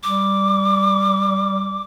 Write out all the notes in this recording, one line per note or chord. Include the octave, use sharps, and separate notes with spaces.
G3 D6